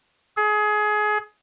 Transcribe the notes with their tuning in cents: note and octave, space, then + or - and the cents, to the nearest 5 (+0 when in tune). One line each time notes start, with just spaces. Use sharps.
G#4 +25